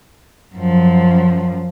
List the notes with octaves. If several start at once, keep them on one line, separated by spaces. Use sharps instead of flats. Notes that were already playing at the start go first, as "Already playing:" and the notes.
F#2 F3